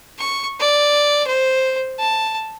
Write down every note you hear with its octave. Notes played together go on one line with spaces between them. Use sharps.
C#6
D5
C5
A5